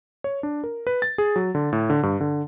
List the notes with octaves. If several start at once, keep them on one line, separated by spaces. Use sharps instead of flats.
C#5
D4
A#4
B4
A6
G#4
F#3
D3
A2
D3
G2
D3